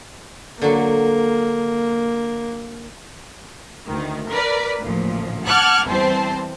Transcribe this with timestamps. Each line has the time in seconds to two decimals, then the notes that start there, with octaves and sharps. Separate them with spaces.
0.62 D3 F#3 A#3
3.87 D2 D#3
4.29 A#4 B4 D5
4.81 A1 D2 A#2 F3
5.45 F#5 A5 D6 F6 F#6 G#6
5.88 E2 E3 G3 C4 C5 A5